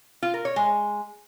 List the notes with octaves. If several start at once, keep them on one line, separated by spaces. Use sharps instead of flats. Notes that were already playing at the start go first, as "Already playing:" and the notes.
F4
A#4
C#5
G#3